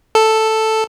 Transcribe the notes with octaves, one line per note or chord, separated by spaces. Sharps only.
A4